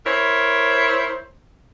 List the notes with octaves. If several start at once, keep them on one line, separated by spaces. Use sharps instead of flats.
E4 A#4 C5 C#5